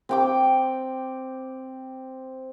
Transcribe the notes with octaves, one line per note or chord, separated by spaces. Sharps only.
C4 G5 D6